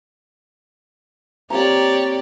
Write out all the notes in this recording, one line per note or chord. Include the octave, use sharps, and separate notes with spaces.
A#3 C4 G4 C#5 D5 A#5